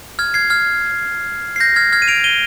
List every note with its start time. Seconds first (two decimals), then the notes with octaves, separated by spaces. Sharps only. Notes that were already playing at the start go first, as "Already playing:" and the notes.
0.19 F6 G#6
0.34 G#6 C7
0.50 F6 G#6
1.56 C7
1.60 G6 A#6
1.76 F6 G#6
1.92 F6 G#6
2.02 D#7
2.08 D7 F7
2.24 D#7 G7